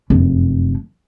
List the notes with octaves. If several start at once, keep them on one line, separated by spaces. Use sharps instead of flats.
F1 F#2